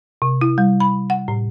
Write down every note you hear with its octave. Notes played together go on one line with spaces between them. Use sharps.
C3
E4
G3
B5
F#5
A2